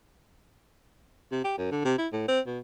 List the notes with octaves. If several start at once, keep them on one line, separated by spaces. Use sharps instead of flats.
C3
G4
F#2
D3
C3
E4
A2
C4
B2